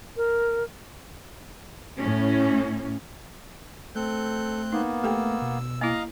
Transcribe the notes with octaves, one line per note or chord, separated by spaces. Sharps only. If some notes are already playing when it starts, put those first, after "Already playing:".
A#4
A2 C#4
A3 C4 A4 F#6 G6
A#3 B3 D#4
A3 G4 A4 G5 E6
B2
A#3 E4 D#5 F5 A#5